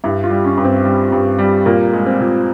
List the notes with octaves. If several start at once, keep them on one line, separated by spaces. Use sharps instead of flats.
G2 E4
F4
G3
C#4
G2
C4
G3
G2
G3
A#2 A#3
G#3
C4
A#2